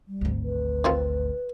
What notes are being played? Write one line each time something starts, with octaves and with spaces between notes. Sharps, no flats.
G3
G#1 D2
B4
D#3 C4 F4